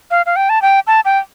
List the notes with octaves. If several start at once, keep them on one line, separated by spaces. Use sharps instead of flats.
F5
F5
G5
A5
G5
A5
G5